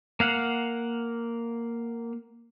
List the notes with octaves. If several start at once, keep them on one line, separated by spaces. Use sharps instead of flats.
A#3 F5 F#5